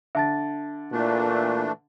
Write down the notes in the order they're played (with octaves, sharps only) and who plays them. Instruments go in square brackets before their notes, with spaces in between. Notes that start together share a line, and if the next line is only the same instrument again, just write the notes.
[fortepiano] D3 [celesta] E5 A5 A6
[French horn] A#2 [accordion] E3 A3 D4